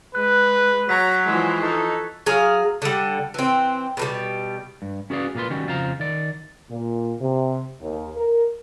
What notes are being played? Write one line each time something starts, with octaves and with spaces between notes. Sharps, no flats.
G#3 B4 F#6
F#3 A#5 C#6 G#6 B6
E3 F3 G#3
D#4 A4
F#3 G#4 F5
D3 G3
E3 C4
B2 D#3 G3
G2
C#4 F#4 G#4 B4 D5 F5
A#2 A#3 F4 B4 C6
D#3 G3 C#4 F#4
F2 C#3 F4 C5 F5 A#5
D#3 D5
A#2
C3
D#2
A#4